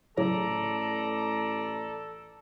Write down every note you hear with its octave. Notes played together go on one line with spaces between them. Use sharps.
A1 A2 C#3 F#3 A4 D5 A#5